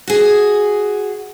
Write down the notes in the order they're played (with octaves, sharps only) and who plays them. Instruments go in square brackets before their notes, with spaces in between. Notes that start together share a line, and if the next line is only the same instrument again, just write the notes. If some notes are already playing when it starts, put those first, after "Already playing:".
[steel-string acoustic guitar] F#4 G#4